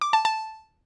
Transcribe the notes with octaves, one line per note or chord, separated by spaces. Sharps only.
D6
A5
A5